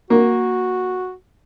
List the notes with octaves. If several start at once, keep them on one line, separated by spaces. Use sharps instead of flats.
A#3 F#4